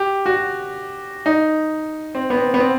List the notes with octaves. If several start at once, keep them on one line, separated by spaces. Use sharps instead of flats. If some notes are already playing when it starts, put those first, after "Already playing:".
Already playing: G4
F#4
D#4
C4
B3
C4
B3
C4